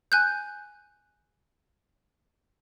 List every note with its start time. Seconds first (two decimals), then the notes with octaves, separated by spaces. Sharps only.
0.12 G#5 F#6 G6